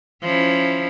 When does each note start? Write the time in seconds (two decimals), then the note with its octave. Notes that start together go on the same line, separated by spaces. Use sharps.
0.22 F3 C#4 E4